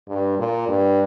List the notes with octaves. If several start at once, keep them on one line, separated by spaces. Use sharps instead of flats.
G2
A#2
G2